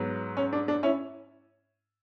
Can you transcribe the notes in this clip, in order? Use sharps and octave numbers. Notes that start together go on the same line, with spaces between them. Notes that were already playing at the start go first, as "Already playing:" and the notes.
Already playing: G#2 F#3 B3
C#4
D4
D4
C#4 E4